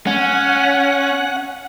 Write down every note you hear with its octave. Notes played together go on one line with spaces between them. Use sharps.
C#4 F#5